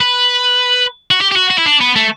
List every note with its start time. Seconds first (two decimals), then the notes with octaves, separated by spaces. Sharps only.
0.01 B4
1.11 F#4
1.21 G4
1.31 G4
1.36 F#4
1.50 F#4
1.58 E4
1.66 D4
1.81 B3
1.96 A3